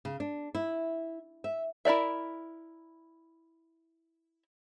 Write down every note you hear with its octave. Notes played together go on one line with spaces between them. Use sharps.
C#3
D4
E4
E5
E4 A#4 D5 E5